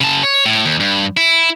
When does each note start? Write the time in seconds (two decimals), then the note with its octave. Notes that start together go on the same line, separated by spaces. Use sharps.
0.01 C#3 A5
0.23 C#5
0.46 A2
0.65 D#2
0.80 G2
1.17 E4